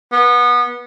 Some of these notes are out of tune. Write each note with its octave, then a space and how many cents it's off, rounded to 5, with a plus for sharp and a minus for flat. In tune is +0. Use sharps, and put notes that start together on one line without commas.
B3 -20